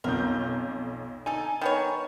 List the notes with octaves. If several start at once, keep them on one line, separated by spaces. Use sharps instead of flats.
B1 F2 A#4 G6
D#4 A4 G#5
D#3 B3 C#5